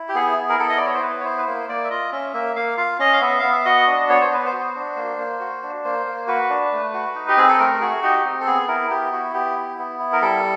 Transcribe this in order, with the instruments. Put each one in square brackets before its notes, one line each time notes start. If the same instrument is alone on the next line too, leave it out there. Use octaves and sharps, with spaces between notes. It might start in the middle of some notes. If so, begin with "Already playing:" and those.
Already playing: [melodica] E4
G4
B3 G#4
E4
A#4
B3 A4
D#5
E4 D5
C#5
C5
B3 B4
C#5
E4 C5
B4
A#3 C5
A#3 D5
E5
F4 D#5
C#4 E5
A#3 E5
A#3 F5
F4 F5
C#4 D#5
F5
B3 E5
B3 F5
E5
F#4 D#5
D4
B3 C#5
C5
B3 B4
C5
F#4
D4
A#3
A#3
F#4
D4
A#3 C5
A#3
F#4 B4
D4
A3
F#4
D#4
G4
C4 G#4
A4
A3 A#4
F#4 G#4
D#4 G4
C4
A4
B3 G#4
E4 A#4
B3 G4
E4 F#4
B3 G4
E4
B3
E4
A#4
G3 A4